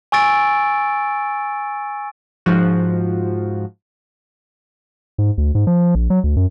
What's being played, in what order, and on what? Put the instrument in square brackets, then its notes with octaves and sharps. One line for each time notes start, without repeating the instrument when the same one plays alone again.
[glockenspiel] G#5 C#6 E6 A6 D7
[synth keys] G#2 F3 F#4
[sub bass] G#2
D2
G#2
F3
A#1
F#3
D2
F#2